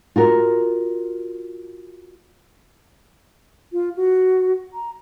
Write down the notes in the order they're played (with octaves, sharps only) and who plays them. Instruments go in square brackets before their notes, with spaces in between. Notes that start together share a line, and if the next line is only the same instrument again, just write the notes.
[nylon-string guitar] F4 F#4 A#4
[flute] F4
F#4
A#5